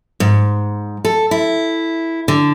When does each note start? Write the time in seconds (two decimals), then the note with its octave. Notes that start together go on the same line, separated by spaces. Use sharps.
0.20 G#2
1.05 A4
1.31 E4
2.28 D3